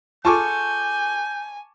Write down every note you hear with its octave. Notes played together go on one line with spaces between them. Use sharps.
F4 G#4 A4 G#5 A5 C#6 D6 G6